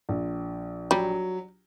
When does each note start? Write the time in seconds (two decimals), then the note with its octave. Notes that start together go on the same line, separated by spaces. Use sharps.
0.09 A#1
0.91 F#3 G3